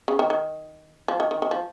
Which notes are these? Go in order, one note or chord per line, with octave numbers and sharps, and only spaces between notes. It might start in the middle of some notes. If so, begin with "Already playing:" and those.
C#3
D#3
D#3
F3
D#3
D#3
D#3
F3